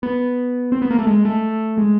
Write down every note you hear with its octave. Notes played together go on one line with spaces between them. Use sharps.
B3
C4
B3
A#3
A3
G#3
A3
G#3